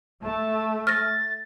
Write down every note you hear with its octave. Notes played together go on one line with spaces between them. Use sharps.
A3 A5
F6 A6 A#6